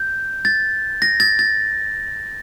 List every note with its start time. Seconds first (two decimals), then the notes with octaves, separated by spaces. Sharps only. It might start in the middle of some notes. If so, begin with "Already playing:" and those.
Already playing: G6
0.45 A6
1.02 A#6
1.20 A6
1.39 A6